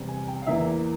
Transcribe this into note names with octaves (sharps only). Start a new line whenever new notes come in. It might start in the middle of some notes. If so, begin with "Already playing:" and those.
Already playing: E2 C3 G3
G#5
G5
F5
E2 E3 A#3 E5